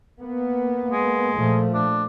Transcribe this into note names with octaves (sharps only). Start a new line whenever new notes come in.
A#3 B3
G#3
A#2 F3 A3
D4